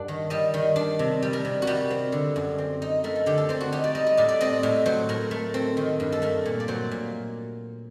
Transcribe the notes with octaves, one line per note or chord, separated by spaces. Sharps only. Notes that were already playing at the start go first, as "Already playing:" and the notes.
Already playing: G2 D4 A#4 F#5
D#3
G3 D#5
D#3
D4
C3
G3
A#4
C3
F#4
G3 G4
C4
D3
F#2
C4
D#4
A3 A#4
A4
D3 G4
A4
C4 C5
F#4
D#4 G4
D5
G3 D#5
D#5
A2 D5
D5
C4 D#5
A2
F#3 C5
A2 A#4
A3
C4
D#3
G2
A4
A3 A#4
A#2
D5
F#3 C5
A#2